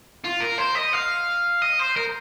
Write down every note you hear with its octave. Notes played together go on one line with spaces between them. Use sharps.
F4
A#4
C5
D#5
F5
D#5
C5
A#4